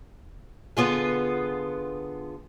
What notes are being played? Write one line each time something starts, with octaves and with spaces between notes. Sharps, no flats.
D3 B3 F4 G#4